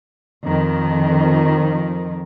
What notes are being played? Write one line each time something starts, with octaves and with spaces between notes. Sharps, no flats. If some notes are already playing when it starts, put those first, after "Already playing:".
F2 D#3